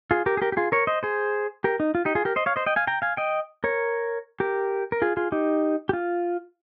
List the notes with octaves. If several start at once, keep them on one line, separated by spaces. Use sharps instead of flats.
F4 G#4
G4 A#4
G#4
G4 A#4
G4
F4 G#4
A#4 C#5
C5 D#5
G#4 C5
G4 A#4
D#4
F4
D#4 G4
F4 G#4
G4 A#4
C5 D#5
C#5 F5
C5 D#5
D#5 G5
F5 G#5
G5 A#5
F5 G#5
D#5 G5
A#4 C#5
G4 A#4
A#4
F4 G#4
F4 G#4
D#4 G4
G4
F4